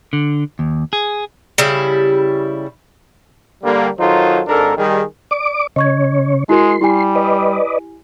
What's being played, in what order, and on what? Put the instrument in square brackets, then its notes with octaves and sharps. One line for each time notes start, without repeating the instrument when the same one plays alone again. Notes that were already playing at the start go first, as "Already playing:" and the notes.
[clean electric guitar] D3
D#2
G#4
[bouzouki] C#3 G3 E4
[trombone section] D3 G3 A#3
D#3 F#3 D#4 F4 A4 C5
G#1 G#2 D4 A4 A#4
D#3 G3 G#4
[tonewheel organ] D5 D6
[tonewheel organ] C#3 C#5 [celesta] D#5 C#6 G#6
[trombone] G#3 [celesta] E4 F#4 A#4 [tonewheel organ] C6
[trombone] G3 [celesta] E4 G4 G#5
[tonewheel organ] B4 D5 D#5